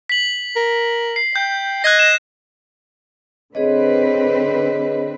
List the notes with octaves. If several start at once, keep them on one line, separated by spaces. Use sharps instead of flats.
B6 F#7
A#4
C7
G5 G6
D#5 F#6 G#6 A#6
E7
D3 C4 G#4 B4 C#5 D#5